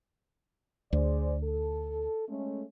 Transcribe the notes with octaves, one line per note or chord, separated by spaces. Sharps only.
D2 G#4 C5 D5
A4
G#3 A3 C#4